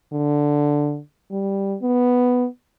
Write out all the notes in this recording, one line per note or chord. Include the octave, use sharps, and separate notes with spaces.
D3
G3
B3